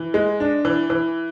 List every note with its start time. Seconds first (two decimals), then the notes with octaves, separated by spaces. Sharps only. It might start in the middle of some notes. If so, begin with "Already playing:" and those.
Already playing: E3
0.14 G#3
0.40 D4
0.65 E3
0.90 E3